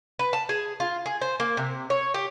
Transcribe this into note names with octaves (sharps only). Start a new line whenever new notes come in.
B4
A5
G#4
F4
G#4
C5
A#3
C3
C#5
G4